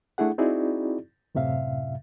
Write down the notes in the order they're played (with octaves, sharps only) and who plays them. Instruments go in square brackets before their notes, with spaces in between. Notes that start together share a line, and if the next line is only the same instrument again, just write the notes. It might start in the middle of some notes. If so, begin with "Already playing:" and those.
[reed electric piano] A3 D4 E4 G#4 F#5
C4 D#4 E4 F#4 G#4 D5
F#2 A2 C3 E5 F5